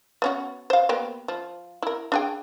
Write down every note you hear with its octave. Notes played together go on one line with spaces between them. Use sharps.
B3 C#4 F#4
C5 F5
A#3 B3 G4
F3
E4 A#4
D4 G#4 G5